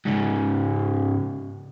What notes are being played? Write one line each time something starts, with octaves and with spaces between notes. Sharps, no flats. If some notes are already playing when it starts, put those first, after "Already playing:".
G#2 C#3